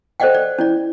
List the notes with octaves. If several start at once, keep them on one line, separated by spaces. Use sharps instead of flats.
A4 C5 D5 D#5 F#5 G5
D5
C#4 E4 D5